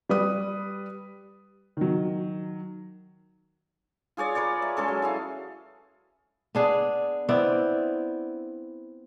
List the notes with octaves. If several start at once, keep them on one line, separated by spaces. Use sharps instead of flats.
G3 B4 D#6
D#3 F#3
F4 G#4 C#5 D5
A#4 B4 C#5 D5
E5
G#3 C#4 A4
F#3
E4 G#4 F5
B3 D4 G#4
B3 C4 E4 D5